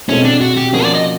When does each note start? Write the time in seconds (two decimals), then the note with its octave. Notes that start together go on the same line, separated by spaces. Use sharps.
0.08 B2 G#3 C4 C#4 E4 A4
0.24 D4
0.41 F#4
0.57 G4
0.73 F3 A#3 C#4 F#4 G#4
0.84 D5
0.95 D#5